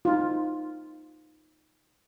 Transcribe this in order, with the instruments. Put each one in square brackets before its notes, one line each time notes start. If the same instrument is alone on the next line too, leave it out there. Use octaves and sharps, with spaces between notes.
[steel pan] D#4 F4